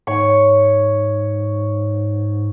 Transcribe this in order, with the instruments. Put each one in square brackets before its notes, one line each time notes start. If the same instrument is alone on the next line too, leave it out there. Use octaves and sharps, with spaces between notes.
[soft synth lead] G#2 [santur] C#5 C#6